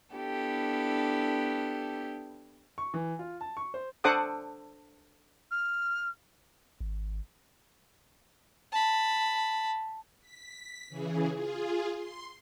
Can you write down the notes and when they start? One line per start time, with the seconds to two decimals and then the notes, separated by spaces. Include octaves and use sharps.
0.13 B3 D4 E4 G4 A4
2.78 C#6
2.94 E3
3.19 F4
3.41 A5
3.57 C#6
3.74 C5
4.04 D4 A4 C5 F#5 D6 D#6
5.51 F6
6.80 G#1
8.72 A5 B5
10.21 B6
10.89 C#3 E3 G#4
11.33 F4 G#4
11.95 C6